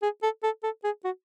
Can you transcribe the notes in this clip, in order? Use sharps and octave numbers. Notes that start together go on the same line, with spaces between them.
G#4
A4
A4
A4
G#4
F#4